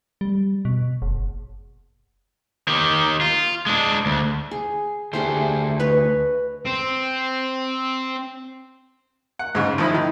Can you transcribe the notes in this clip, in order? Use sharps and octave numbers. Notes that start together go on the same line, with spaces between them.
G3
B2
F#1
D#3 G4
F4
G#3 D4
D2
G#4
D2 A3 G4 G#4 C5
B4 C#5 D#5
C4
F#5
G#2 C#3
G#1 F3 D#4 E4 B5
D#3